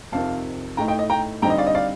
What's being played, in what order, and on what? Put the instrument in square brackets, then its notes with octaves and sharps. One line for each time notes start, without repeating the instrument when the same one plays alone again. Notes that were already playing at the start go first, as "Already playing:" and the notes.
[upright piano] F2 C3 D#3 F5 A5
A2 A3 D#4 G5 A#5
D#5 G5
D#5
G5 A#5
D3 G3 C4 D#4 G5 A#5
D#5
D5 F5
D#5
D5 F5